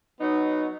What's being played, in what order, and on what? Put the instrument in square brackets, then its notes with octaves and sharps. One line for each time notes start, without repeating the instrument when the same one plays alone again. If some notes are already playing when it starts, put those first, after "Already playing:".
[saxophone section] F#3 B3 D#4